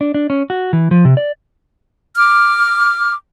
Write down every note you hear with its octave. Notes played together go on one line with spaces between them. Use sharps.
D4
D4
C#4
F#4
E3
F3
C3
D5
D6 F6